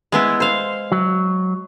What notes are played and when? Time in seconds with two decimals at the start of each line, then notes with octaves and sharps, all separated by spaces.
0.12 G#3 B3 E4
0.40 C5 F5
0.92 F#3